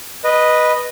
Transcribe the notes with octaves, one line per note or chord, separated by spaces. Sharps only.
B4 D#5